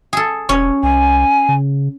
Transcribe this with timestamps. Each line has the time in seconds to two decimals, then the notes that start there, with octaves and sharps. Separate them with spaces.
0.13 G#4 A4
0.49 E1 C#4 C#5
0.83 C2 G#5
1.49 C#3